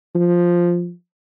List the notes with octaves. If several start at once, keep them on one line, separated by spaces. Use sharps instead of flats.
F3